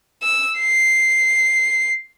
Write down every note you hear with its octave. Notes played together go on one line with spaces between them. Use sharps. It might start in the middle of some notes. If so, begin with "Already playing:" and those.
E6
C7